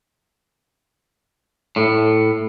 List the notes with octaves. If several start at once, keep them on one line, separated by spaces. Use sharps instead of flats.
A2